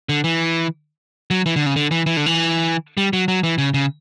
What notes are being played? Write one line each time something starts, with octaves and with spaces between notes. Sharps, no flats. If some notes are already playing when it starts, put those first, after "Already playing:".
D3
E3
F#3
E3
D3
C#3
D3
E3
E3
D3
E3
G3
F#3
F#3
E3
C#3
C#3